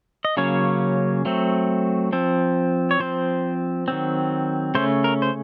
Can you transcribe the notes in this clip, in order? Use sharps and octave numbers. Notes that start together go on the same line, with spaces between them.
D#5
C#3 F#3 A#3 C#4 C#5
F#3 A3 C4
F3 C4
C#5
F3 C4 C5
D#3 F#3 C4
C#3 A3 C#4 C5
A#4
C5